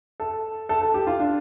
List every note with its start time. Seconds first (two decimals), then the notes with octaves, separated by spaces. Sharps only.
0.20 A4
0.69 A4
0.82 A4
0.94 G4
1.07 F4
1.20 D4